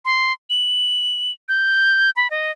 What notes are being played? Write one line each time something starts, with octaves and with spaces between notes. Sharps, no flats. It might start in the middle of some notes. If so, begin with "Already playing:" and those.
C6
F#7
G6
B5
D#5